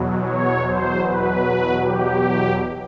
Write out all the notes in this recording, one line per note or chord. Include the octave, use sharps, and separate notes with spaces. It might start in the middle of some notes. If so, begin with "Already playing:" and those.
Already playing: E2 B2 F#3
C#5
C5
B4
G4